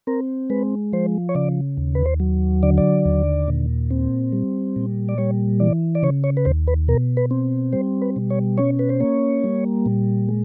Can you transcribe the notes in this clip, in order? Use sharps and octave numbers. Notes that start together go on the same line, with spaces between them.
C4 A#4
G#3 B4
F3 C5
C#5
C#3 D5
D#2
B4
C5
F#3
D3 D5
D5
D#2
A#2
C4
G3
A#2
D5
G3 C#5
E3 D5
D5
C#3 C#5
C#5
B4
D#2 C5
B4
B2 A#4
B4
C4
G3 C5
B4
B2
C#5
C#4 C#5
B4
C5
A#3 C#5
G3
A#2
G#3